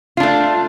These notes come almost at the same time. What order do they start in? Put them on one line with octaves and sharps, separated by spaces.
F4 D4 A3